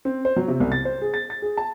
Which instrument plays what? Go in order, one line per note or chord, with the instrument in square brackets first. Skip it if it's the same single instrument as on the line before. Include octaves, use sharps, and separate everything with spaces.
[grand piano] C4
C5
F#3
C3
C2
A6
C5
G#4
A6
A6
G#4
A5